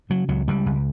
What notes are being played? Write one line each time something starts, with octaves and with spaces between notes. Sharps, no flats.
C#3 F#3
C#2 F#3
C#2 G3
C#2